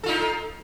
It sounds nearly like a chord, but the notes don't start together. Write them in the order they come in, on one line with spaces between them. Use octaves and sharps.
A4 F4 D#4